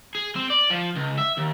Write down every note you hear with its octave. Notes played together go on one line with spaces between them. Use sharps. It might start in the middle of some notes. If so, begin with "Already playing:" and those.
G#4
C4
D5
F3
C#2
E5
D#2